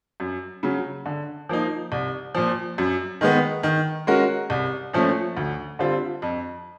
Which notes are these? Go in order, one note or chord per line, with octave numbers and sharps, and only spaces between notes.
F#2
C#3 F#3
D3
F3 A#3 D#4
C2
A#2 F3
F#2
D#3 G#3 B3
D#3
G#3 C#4 F#4 A#4
C2
A#2 F3 A3 C#4
D2
D3 G3 C4 F4
F2